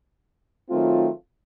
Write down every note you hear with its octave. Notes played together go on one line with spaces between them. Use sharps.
D#3 F#3 A3 C4 F4